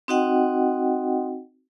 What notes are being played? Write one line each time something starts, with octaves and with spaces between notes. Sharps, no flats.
C4 D#4 F#4 D#5 F#5 G5